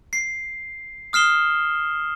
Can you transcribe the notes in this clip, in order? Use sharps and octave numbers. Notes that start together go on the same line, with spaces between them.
C7
D#6 F6 C7 E7 G7